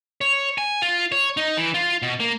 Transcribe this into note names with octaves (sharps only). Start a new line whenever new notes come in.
C#5
G#5
F4
C#5
D#4
E3
F4
B2
A#3